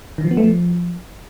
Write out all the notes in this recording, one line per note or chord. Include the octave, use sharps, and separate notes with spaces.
D#3
F3
B3
A3
F3